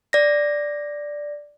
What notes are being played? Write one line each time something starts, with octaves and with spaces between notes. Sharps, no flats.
D5 A#6